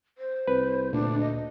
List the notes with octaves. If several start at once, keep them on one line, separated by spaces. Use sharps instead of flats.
C5
C2 B4
D2 A#2 D4
D#5